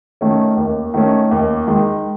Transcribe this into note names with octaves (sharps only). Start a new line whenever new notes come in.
D#3 A3 C#4
D#2
D#3 A3 C#4
D#2
D#3 G#3